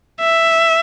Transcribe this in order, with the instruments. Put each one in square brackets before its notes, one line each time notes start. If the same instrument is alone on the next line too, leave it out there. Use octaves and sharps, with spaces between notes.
[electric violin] E5